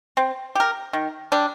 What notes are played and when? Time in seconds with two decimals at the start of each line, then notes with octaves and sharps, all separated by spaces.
0.17 C4
0.55 G4 A#4
0.93 D#3
1.32 G3 D4